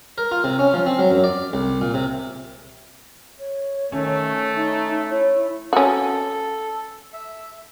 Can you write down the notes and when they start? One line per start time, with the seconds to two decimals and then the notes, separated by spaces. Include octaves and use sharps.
0.18 A#4
0.32 F4
0.44 C3
0.59 C#4
0.74 F3
0.86 C4
0.99 F#3
1.11 F#2
1.24 D5
1.53 C2
1.81 A#2
1.94 C3
3.39 C#5
3.92 D#3 A3 C#4
4.56 D#4 E5
5.10 E4 C#5
5.73 C#4 F#4 A4
7.13 E5